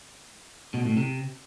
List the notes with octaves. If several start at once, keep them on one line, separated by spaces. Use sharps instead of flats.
B2
A2
C3